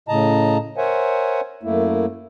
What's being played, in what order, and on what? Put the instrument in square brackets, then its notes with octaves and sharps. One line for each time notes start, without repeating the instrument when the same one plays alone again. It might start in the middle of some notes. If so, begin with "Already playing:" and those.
[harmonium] A2 C#3 D#5 A5 A#5
A#4 C5 C#5 E5 F#5 G#5
F#2 A3 A#3 E4